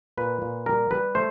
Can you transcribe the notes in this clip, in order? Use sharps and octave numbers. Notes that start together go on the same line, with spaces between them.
A#2 B4
A#2
G3 A#4
G3 B4
A3 C5